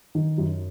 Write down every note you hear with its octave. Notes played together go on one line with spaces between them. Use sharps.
D#3
F#2